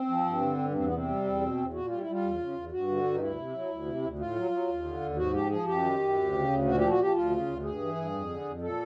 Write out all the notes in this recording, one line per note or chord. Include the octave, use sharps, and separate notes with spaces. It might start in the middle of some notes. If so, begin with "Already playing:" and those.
Already playing: C4
F3
G2
D3
G2
E2 C4
B3
C3 C4
G3
E2
B2
E2
A#2 F#4
G3 F4
E4
G3
F4
E2
C#3
E2
G2 F#4
D3
G2
D#4
D2 E4
C3
F#3
D2
C3
D2
A2 F4
F#3
F#3
D#2
D3
D#2
G#2 F#4
F3 G4
F3 G#4
F#2 G4
D#3
F#2
D2
C#3
D2
A#2 F#4
F3 G4
F#4
F3 G4
D2 F4
C#3
D2
G2 G#4
E3
G2
F2
D3
F2
A#2 A4